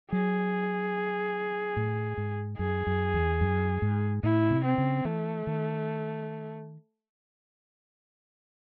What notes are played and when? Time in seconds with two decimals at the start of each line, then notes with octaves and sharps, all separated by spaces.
0.12 F#3 G#4
1.77 A2
2.17 G#2
2.58 F#2 G#4
2.87 F#2
3.14 E2
3.41 F#2
3.82 G#2
4.23 A2 E4
4.51 C3
4.65 C4
4.78 C#3
5.05 E3 A3
5.47 D#3